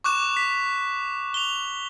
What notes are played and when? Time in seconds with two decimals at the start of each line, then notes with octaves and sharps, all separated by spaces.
0.04 C#6 D6 F#6 E7
0.37 B6
1.34 F7 G7